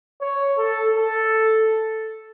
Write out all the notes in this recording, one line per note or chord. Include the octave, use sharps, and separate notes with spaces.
C#5
A4
A4